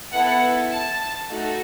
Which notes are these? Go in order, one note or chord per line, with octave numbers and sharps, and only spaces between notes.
B3 E4 A4 F#5
A5
A3 D#4 F#4 A4